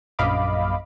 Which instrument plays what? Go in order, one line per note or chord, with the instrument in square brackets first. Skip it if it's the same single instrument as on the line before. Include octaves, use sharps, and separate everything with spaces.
[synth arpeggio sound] A#1 F#2 D#5 F5 B5 D6